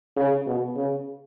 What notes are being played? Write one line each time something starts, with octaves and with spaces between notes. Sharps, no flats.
C#3
B2
C#3